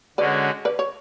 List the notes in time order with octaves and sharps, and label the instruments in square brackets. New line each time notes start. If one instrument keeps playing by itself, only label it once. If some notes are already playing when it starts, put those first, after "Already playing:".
[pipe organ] D3 G#3 C#4 F#4 [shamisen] B4 D5
[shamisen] B4 D5
C#5